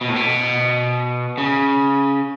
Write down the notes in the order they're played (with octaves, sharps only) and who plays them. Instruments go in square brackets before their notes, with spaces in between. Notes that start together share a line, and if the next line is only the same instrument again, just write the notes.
[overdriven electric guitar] B2
A2
B2
C#3